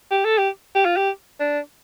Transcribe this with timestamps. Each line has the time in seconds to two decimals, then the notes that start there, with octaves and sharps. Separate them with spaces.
0.11 G4
0.25 A4
0.38 G4
0.75 G4
0.85 F4
0.96 G4
1.40 D4